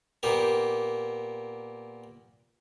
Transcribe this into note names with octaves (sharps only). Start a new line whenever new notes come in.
A#2 A#3 B3 G4